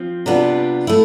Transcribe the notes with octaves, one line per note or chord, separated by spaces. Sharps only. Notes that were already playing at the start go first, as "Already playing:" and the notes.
Already playing: F3 C4
C3 G3 B3 D4 F4
A3 E4